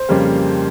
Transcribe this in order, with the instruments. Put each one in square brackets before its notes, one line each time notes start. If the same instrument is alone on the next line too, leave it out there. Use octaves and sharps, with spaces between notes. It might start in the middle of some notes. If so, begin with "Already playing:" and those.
Already playing: [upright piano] C5
F2 C#3 G3 A#3